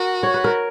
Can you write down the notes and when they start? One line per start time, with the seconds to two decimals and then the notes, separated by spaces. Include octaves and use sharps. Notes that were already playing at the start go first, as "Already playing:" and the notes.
Already playing: F#4 A#4
0.23 C#5
0.34 B4
0.44 A#4